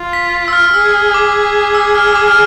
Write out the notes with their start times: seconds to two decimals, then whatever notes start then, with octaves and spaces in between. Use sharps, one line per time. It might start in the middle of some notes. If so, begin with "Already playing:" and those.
Already playing: F4
0.13 B6
0.48 E6
0.53 F6
0.74 G#4 E6
1.14 D6
1.74 E6
1.95 F6
2.07 E6
2.16 D6
2.28 F6